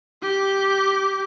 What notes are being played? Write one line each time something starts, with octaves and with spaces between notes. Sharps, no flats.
G4 D6